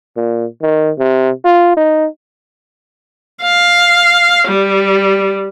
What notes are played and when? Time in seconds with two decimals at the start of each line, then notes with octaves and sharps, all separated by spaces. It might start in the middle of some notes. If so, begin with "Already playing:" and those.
0.17 A#2
0.62 D#3
0.98 C3
1.45 F4
1.77 D#4
3.42 F5
4.48 G3